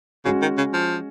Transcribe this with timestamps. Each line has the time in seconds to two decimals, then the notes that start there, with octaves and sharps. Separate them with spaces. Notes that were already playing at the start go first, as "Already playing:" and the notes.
0.25 C#3 G#3 C#4 F#4
0.42 D#3
0.58 C#3
0.73 F3